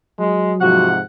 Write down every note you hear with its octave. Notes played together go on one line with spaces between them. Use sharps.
F#3 G#3
G#2 C3 F3 F#4 F#5